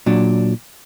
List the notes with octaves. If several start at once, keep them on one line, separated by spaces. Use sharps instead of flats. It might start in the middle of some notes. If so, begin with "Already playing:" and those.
A#2 F#3 D4